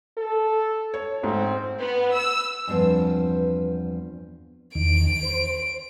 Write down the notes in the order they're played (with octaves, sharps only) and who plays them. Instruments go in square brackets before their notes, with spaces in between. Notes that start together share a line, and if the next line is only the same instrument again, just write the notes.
[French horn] A4
[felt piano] C#5
[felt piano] G#2 A3 [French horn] C4
[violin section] B3
E6
[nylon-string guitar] E2 G2 F3 B3 C4
[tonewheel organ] E2 D#3 [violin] D7
[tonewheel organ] C5